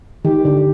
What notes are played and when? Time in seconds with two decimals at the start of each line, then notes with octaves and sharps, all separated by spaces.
0.25 D#3 G4
0.45 D3